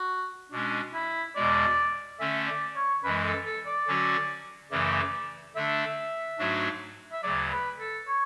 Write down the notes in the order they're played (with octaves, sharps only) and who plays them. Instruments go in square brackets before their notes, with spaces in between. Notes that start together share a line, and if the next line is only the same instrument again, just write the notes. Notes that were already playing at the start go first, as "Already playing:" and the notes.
Already playing: [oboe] F#4
[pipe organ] B2 G#3 C#4 [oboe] D4
[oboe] E4
[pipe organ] E2 B2 G#3 [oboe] D5
[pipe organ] D3 A3 C#4 [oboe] E5
[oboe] D5
C#5
[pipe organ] F#2 E3 G#3 [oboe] B4
[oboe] A4
A4
D5
[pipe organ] D3 F#3 C#4 F#4
[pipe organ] F#2 C#3 E3 A3 [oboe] D5
[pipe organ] D3 A3 D4 [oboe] E5
[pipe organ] G#2 F#3 A3 D4 F#4
[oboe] E5
[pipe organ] D2 C#3 F#3 [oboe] D5
[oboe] B4
A4
C#5